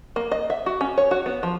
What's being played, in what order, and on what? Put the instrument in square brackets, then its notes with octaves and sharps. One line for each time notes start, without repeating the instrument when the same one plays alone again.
[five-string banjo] A#3
D#5
E5
F#4
C#4
C#5
F#4
B3
F3